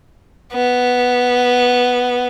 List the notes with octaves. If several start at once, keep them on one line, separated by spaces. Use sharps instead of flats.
B3